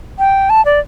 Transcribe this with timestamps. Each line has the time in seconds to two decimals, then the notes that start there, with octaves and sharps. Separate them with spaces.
0.19 G5
0.50 A5
0.66 D5